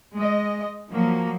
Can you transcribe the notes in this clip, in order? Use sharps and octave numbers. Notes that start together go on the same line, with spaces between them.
G#3 D#5
F3 F#3 A#3